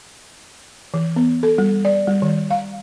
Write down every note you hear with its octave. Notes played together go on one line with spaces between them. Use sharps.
E3
B3
A4
G3
D5
G3
D#3
F5